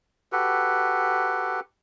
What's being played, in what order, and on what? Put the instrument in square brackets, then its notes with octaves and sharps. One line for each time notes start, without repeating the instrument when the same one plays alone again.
[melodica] F#4 G4 A4 B4